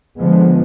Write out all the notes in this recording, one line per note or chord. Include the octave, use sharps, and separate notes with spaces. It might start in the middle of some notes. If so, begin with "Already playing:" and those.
D3 F3 G#3 B3